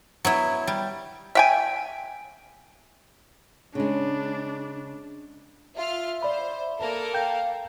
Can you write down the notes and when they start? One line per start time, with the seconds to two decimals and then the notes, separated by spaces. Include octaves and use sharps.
0.25 F#3 B3 E4
0.67 G3
1.35 E5 G5 G#5
3.75 C#3 G#3 D4
5.76 F4 E5 F6
6.23 C5 D5 B5
6.80 A#3 A4 A#4
7.14 F5 G5 G6